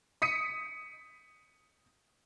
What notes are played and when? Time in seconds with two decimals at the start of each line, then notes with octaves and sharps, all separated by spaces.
0.22 D#6 B6 C#7 D#7